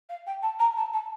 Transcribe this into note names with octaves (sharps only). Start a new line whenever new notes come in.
F5
G5
A5
A#5
A5
A5